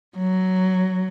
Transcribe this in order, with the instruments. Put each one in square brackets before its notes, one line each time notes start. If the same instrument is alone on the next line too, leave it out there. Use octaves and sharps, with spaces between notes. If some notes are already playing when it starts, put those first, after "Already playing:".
[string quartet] F#3